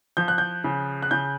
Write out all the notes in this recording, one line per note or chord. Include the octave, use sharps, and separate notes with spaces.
F3 G6
F#6
G6
C#3
F#6
C#3 G6